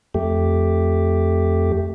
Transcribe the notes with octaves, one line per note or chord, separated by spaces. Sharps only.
F2 A3 G4